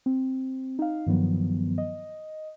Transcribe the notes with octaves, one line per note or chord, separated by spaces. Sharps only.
C4
D#4 F5
G2 D#3 F3 F#3 B3
D#5